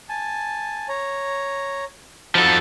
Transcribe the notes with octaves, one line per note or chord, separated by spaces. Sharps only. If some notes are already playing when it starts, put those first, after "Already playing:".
G#5 A5
C#5 A#5
F3 D#4 F#4 A4 B5